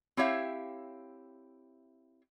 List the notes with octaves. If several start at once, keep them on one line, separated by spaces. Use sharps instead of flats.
C4 E4 G4 C#5 E5 F5